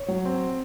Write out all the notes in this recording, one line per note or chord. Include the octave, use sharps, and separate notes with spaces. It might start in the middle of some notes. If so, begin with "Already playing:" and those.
Already playing: C#5
F#3
C4